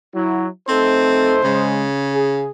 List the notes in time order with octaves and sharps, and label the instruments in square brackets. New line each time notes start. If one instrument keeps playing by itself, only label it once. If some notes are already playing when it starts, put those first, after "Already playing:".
[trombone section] F#3 E4
[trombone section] A3 D#4 A4 [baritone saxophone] C4 [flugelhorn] C5
[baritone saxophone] C#3 [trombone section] G#3
[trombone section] G#4